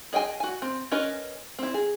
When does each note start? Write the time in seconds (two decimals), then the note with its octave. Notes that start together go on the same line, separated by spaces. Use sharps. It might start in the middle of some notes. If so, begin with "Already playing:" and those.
0.13 G#4 D#5 G5 G#5
0.40 F#4 G#5
0.62 C4
0.91 C#4 A#4 B4 D#5
1.59 C4 E4
1.74 G#4